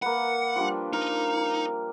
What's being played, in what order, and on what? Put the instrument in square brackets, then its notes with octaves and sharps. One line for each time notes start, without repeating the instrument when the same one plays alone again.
[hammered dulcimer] A#3 B4 [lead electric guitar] F#5
[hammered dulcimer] F3 G3 D4
[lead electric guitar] D#4 [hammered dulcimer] A#4